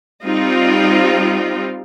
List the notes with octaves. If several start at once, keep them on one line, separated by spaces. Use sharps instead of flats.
G3 C4 D#4 F4